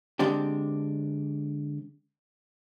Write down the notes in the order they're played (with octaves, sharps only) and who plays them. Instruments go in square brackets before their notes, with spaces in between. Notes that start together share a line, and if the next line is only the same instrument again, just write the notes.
[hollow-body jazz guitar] D3 G#3 C4 D4 G4